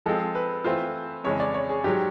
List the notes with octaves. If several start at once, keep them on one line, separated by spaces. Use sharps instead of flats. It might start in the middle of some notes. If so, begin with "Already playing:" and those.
F3 G#3 C4 F4 A4
B4
E3 A3 C4 F4 C5
F2 C#3 E3 G#3 C#4 C#5
D5
C#5
G#4
G#2 D#3 F#3 G4